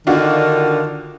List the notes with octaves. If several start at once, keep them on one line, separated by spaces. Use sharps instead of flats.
D3 D#3 D4 F4 F#4